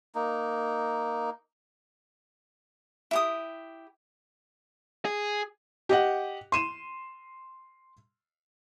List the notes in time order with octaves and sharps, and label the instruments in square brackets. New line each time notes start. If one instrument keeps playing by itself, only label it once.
[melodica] A#3 D#4
[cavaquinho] E4 G4 D#6
[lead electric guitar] G#4
[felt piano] G4 D#5 F#5
C6 D#7 E7